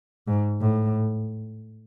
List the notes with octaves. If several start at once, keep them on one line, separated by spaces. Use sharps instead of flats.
G#2
A2